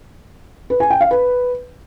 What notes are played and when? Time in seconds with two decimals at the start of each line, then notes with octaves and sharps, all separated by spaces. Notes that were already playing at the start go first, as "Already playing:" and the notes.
0.70 B4
0.80 G#5
0.90 G5
1.01 F5
1.11 B4